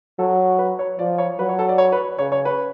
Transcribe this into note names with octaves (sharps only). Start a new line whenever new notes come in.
F#3 A4
B4
C#5
F3 D5
C#5
F#3 B4
C#5
A4
D5
C#5
B4
C#3 C#5
C#5
B4